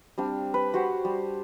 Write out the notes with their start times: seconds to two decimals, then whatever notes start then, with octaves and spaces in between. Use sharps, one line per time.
0.18 G3 C4 D4 F5
0.54 B4
0.74 F#4 G4 C5
1.05 G3